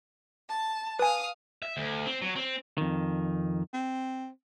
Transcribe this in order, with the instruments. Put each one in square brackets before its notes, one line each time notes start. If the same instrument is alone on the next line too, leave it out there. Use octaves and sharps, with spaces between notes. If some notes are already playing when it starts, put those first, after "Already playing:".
[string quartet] A5
[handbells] B4 G#5 [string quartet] F5 D#6
[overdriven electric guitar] E5
D2
C4
F#3
C4
[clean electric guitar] F2 D#3
[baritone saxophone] C4